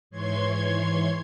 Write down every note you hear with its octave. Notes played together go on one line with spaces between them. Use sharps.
G#2 E3 C#5 C6 G#6